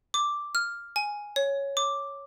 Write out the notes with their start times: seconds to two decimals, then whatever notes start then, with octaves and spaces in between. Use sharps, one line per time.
0.14 D6
0.55 F6
0.96 G#5
1.36 C#5
1.77 D6